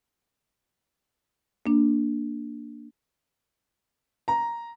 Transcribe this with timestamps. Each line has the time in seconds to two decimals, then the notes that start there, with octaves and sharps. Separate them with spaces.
1.66 A#3 D4
4.28 A#5